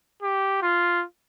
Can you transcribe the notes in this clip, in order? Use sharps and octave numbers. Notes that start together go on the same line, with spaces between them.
G4
F4